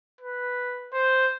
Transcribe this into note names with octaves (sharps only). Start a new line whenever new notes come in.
B4
C5